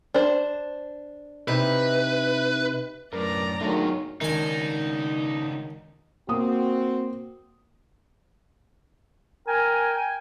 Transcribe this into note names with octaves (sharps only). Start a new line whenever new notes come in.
D4 C5
C3 D#4 E4 B4
F#2 A2 A#4 B4 D5 A#5
G#2 D#3 F#3 A3 B3 D4 F4
C#2 D#3 D4 D#4 G#5
A#3 C4 F#4 D#6
A#4 G5 G#5